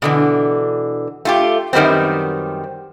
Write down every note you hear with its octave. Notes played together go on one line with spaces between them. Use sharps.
B2 D3 E3
A3 F4 G4
F#2 D#3 G3 B3 C4